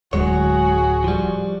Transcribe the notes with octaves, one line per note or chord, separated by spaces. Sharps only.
D1 F#3 G#3 F#4 G#4 C#5
F3 G3